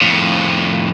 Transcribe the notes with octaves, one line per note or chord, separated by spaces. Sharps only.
F2 A2